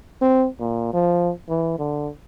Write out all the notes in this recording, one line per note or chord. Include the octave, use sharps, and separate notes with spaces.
C4
A#2
F3
E3
D3